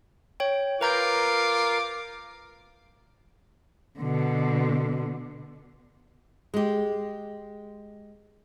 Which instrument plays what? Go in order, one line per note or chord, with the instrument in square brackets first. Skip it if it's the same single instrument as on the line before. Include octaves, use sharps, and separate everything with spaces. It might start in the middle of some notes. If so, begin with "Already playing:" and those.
[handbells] C#5 G5
[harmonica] F4 D6 [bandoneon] A#4 [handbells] B4 A#5 G6
[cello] B2 D3
[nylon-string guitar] G#3 G4